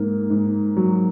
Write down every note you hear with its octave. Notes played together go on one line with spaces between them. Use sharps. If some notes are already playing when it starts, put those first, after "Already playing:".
Already playing: G#2 A#3
G#2
F#3